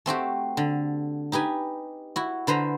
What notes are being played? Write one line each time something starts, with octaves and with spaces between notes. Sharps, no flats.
A3 C4 F#4 G4
D3
D#4 G4 B4 G#5
E4 F#4
D3 B4 C5 A#5